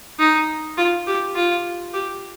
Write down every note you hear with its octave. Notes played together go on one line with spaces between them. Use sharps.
D#4
F4
G4
F4
G4